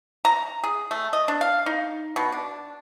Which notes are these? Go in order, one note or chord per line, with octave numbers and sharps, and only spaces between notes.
A#5
G#4
A3
D#5
D4
F5
D#4
B2
D4